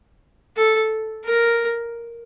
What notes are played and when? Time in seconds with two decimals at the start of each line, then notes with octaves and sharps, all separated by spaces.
0.57 A4
1.25 A#4